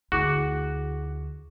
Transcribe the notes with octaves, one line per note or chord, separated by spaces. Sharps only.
D2 E4 F#4 G#4 D6